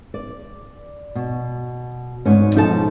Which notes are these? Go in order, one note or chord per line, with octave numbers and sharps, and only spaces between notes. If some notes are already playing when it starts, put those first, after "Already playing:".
D5
B2
D2 G#2 C#4
B2 F3 D#4 A4 D5 A5